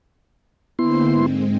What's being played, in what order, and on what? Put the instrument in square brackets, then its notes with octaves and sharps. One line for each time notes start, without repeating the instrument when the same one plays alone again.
[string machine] D3 A#3 C5 [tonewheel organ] B3 E4 C6
[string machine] G#2 G#3 C4